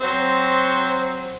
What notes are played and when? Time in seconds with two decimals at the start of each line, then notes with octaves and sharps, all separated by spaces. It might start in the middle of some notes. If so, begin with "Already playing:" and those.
0.01 F#3 C4 C5